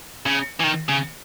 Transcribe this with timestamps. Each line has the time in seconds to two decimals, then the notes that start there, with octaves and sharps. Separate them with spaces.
0.26 C#3
0.60 E3
0.64 D#3
0.89 C#3